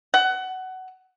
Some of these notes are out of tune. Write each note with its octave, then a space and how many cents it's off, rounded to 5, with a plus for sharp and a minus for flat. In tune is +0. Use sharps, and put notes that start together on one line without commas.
F#5 +20